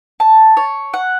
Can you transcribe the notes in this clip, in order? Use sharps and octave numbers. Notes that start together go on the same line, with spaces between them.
A5
C#5
F#5